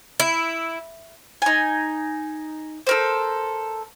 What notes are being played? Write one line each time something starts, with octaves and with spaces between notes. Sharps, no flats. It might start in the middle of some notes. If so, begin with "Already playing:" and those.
E4
D#4 G#5
A4 A#4 C5